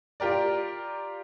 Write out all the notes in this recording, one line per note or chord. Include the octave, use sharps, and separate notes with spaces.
F4 G4 A#4 D5